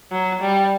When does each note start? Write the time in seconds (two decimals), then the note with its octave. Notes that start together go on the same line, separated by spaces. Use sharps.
0.12 F#3
0.42 G3